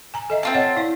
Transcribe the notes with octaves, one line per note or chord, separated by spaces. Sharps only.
G#5 A#5
A4 D#5 E5
C4 F4 A5
C#5 D#5 F#5
E4 D5